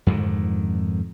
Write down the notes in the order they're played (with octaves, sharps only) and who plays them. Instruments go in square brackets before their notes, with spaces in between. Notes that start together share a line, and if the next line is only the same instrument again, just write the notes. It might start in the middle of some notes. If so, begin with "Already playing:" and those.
[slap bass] F2 G#2 D3 D#3